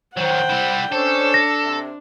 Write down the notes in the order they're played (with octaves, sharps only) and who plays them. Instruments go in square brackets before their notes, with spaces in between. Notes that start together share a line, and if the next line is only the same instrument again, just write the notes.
[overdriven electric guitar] D#3 F#3 [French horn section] C5 [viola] F#5 G5
[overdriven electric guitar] G3 E4
[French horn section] C#4 C5 [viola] D4 [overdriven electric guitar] A4
[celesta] A#6
[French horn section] C3